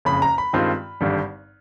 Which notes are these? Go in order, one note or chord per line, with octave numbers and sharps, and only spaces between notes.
F#1 F2 C#3 B5
A#5
B5
G2 D#3 G#3 C4 F4
G#1 G2 D3 G3